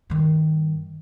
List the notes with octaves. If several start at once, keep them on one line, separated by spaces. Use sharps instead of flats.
G2 D#3